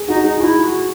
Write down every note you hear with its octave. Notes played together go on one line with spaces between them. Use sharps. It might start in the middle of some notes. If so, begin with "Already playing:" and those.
Already playing: G#4
D#4 F#4
D#4 G#4
E4 F#4 G#4
F#4